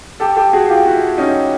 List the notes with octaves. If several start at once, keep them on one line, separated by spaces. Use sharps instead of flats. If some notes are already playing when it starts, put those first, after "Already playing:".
G4 A4
G4 A4
F#4 G#4
F4 G4
E4 F#4
C#4 D#4